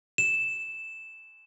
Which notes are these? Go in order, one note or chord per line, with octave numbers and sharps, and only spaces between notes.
E7